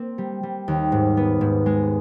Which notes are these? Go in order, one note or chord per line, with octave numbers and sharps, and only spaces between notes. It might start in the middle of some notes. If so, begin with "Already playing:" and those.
Already playing: A#3 C4
G3
G3
D#2
G#2
B3
G#2
G#3